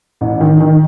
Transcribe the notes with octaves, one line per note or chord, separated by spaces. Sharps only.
A1
D#3
D#3